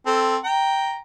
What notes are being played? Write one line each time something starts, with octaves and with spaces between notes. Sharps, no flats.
C4 A4
G5 A#5